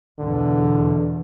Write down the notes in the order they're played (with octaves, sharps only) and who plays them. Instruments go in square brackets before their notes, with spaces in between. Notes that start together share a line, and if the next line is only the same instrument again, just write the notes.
[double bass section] E2 B2 [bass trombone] D3